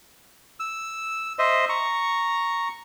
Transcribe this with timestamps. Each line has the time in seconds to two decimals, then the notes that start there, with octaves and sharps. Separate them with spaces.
0.60 E6
1.39 C5 D#5 E5
1.69 A#5 C#6